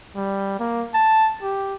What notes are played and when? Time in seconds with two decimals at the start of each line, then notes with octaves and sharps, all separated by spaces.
0.16 G3
0.59 A#3
0.94 A5
1.43 G4